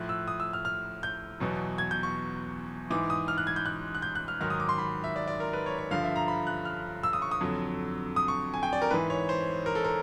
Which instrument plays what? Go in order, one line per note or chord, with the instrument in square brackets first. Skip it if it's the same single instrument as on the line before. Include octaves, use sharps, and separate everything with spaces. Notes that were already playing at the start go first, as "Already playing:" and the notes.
Already playing: [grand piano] A2 F3 F#6
E6
D#6
E6
F6
F6
G6
E2 B2 F#3
G#6
G6
C#6
G#2 E3 D6
D#6
F6
F#6
G#6
G6
F#6
F#6
G6
F#6
F6
G#2 D#3 F#3 F6
D#6
D6
C6
B5
E5
D5
D5
A#4
B4
C#5
C#5
G2 D3 F3 F5
E5
A#5
B5
F#6
F6
E6
D#6
C#6
D#6
F2 D3 F#3
D#6
C#6
G#5
G5
D5
A#4
G#2 E3 B4
C#5
C5
A#4
A4
A#4